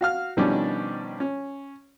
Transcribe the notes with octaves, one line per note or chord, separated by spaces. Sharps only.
F#4 F5 F6
B2 D#3 F3 G3 C#4 D4
C#4